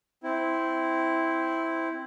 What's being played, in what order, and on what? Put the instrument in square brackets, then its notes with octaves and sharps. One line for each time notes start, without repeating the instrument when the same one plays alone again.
[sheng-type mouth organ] C4 E4